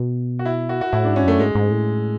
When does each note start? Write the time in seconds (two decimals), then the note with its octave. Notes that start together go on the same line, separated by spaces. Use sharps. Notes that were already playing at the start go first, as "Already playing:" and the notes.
Already playing: B2
0.39 F#4
0.45 E4
0.69 F#4
0.81 F#4
0.92 A2 E4
1.04 D4
1.08 G#2
1.16 C#4
1.24 F#2 A3
1.40 G#2 G#3
1.55 G#2
1.71 A2